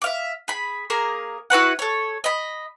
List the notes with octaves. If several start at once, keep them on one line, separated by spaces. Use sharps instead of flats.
E5 F5 D6
G#4 B5
A#3 G#4 A#4
E4 F#4 B4 F#5
A4 C#5
D#5 B5